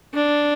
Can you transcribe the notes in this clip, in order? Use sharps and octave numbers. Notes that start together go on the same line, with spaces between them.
D4